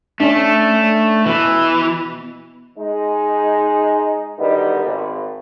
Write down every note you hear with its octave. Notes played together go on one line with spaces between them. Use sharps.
A3 C#4 D4
B2 E3
G#3 D#4
B2 D3 D#3 G3 B3 D#4
G#1